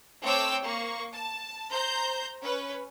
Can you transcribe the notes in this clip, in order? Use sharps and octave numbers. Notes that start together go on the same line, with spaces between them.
A3 C4 C#5 G5 D6 E6
A#3 C#6
A5
C5 A#5 G6
C#4 B4